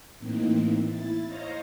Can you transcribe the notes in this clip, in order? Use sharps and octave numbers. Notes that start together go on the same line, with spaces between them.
A2 E3 A#3 C4 D#4
E4 A6
C5 C#5 D#5 F5 A#5